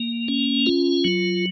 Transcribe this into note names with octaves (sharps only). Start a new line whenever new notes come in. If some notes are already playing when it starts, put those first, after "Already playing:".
Already playing: A#3
C#4
F4
F#3